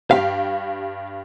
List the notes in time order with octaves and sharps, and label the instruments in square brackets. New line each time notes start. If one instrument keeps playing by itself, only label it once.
[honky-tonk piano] G2 G4 B6 [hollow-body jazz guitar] F5